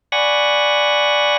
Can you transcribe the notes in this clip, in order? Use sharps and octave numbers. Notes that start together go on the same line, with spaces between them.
D5 F#5 G#5 B5 C#6 A#6